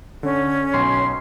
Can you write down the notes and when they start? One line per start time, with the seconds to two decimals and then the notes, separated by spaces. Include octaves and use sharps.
0.23 D3 C#4
0.74 B1 G#5 C6